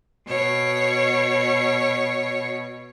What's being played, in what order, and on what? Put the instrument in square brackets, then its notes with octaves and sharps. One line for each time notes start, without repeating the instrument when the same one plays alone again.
[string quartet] B2 C#5